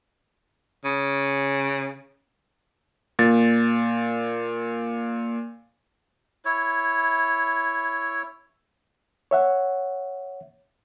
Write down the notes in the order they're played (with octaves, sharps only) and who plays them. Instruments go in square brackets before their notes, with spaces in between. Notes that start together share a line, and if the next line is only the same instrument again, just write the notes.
[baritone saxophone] C#3
[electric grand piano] A#2 A6
[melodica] E4 C#5
[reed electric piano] C#5 E5 F#5